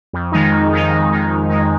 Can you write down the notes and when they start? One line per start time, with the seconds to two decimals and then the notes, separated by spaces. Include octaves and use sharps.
0.13 F2
0.32 D#3 G#3 D#4
0.52 F2
0.72 D#3 G#3 D#4
0.92 F2
1.11 D#3 G#3 D#4
1.30 F2
1.50 D#3 G#3 D#4